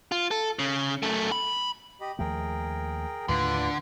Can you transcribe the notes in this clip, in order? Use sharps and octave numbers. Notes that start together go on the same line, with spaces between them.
F4
A4
C#3
F#2 A3
B5
G4 D#5 B5
D#2 F3 A3 G#4 A#4 G5
D#2 A2 D3 F4 B4 D6